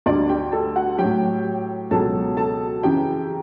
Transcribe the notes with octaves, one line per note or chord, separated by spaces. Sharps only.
D2 D3 G3 D4 D5
G4 G5
A4 A5
F#4 F#5
A2 F#3 G4 G5
C#2 B2 F#3 A4 A5
A4 A5
F#2 C#3 E3 G4 G5